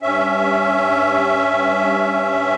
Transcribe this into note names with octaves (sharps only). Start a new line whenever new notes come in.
G2 C#4 E5